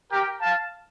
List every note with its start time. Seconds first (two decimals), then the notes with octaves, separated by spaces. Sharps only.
0.10 G4 A#4
0.41 F5 A5